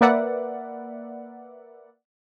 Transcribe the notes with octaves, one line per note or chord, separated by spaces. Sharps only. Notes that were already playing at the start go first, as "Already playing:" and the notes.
A#3 A#4 B4 D5 E5 F#5